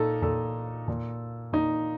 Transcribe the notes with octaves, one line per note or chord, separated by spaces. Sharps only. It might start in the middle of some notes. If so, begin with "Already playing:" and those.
Already playing: A#2 D#4 A4
A#2 A4
A#2
A#2 D#4